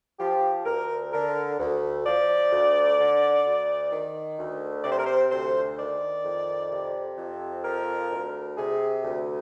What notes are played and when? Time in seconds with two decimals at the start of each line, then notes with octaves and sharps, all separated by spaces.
0.19 F3 G4
0.66 D2 A#4
1.13 D3 A#4
1.59 D2
2.06 F3 D5
2.52 D2
2.99 D3
3.46 D2
3.91 D#3
4.39 D2
4.84 C3 D5
4.92 C5
4.99 A#4
5.06 C5
5.32 D2 C5
5.78 D#3 D5
6.25 F2
6.71 C3
7.18 F2
7.64 F3 A#4
8.11 D2
8.57 C3 G#4
9.03 D2